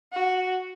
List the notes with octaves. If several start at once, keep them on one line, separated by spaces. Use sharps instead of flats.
F#4